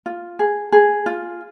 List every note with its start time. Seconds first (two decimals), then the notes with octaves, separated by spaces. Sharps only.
0.06 F4
0.39 G#4
0.72 G#4
1.06 F4